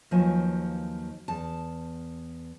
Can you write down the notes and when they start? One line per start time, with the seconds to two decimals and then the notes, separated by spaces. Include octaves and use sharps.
0.11 D#2 F3 F#3 B4 G#5
1.28 E2 A5